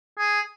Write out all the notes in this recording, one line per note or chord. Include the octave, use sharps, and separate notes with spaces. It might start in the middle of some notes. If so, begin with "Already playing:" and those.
G#4